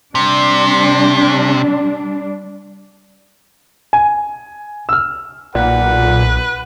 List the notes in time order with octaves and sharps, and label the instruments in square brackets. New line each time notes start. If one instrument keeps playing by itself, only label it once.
[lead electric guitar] C3 [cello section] G3 D4
[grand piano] G#5
E6 F6
[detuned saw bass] B1 [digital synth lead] A#2 [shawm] B4 [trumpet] F#5